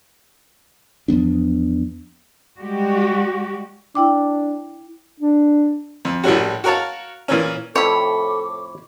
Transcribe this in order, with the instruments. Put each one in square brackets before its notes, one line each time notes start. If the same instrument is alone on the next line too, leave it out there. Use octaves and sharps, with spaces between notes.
[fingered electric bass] E2 F3 B3 D4
[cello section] G3 G#3 F#4 G4
[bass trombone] D4 [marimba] E4 G5 D6
[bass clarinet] D4
[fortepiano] F2
A#1 A2 G3 C#4 F#4
F#4 A#4 C#5 F5 A5
A#2 E3 C#4
[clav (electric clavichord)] F2 A2 E4 [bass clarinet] A4 [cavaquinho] C#5 B5 [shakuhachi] D6